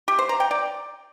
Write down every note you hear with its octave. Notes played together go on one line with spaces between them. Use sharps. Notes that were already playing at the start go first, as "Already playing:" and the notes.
G4
C5
A#5
G5
D5